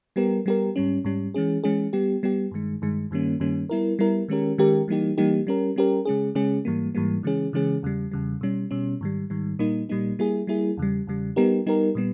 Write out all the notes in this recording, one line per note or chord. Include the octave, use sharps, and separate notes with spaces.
G3 B3 G4 A#4
G3 B3 G4 A#4
G#2 G3 C#4
G#2 G3 C#4
E3 G#3 C#4 G#4
E3 G#3 C#4 G#4
G3 B3 G4
G3 B3 G4
G2 D#3 G#3
G2 D#3 G#3
G2 D#3 G3 A#3 C#4
G2 D#3 G3 A#3 C#4
G3 B3 E4 A#4
G3 B3 E4 A#4
D#3 G#3 C#4 G4 A#4
D#3 G#3 C#4 G4 A#4
E3 G3 A#3 D#4 G4
E3 G3 A#3 D#4 G4
G3 C#4 G4 A#4
G3 C#4 G4 A#4
C#3 G#3 C#4 G#4
C#3 G#3 C#4 G#4
G#2 E3 G3 A#3
G#2 E3 G3 A#3
C#3 E3 G#3 C#4 G#4
C#3 E3 G#3 C#4 G#4
E2 C#3 G3
E2 C#3 G3
B2 G3 C#4
B2 G3 C#4
G#2 D#3 G3
G#2 D#3 G3
A#2 G3 A#3 D#4
A#2 G3 A#3 D#4
G3 A#3 E4 G#4
G3 A#3 E4 G#4
E2 C#3 G3
E2 C#3 G3
G3 B3 D#4 G4 A#4
G3 B3 D#4 G4 A#4
A#2 G3 B3